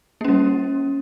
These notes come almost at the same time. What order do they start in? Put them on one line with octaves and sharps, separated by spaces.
A#3 C#4 G3